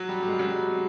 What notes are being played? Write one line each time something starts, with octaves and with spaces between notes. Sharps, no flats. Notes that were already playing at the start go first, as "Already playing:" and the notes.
Already playing: F#3
G3
G3
G#3
F#3
G3